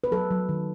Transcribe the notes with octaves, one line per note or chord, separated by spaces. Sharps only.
B4
F#3 A4
F#3
D#3